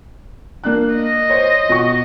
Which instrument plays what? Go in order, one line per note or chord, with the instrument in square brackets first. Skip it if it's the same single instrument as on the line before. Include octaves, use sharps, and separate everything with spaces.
[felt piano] A#3 D4 F#6
[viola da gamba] D#5
[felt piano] C5 C#5
B2 C#6